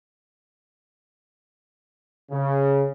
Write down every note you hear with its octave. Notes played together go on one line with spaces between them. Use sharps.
C#3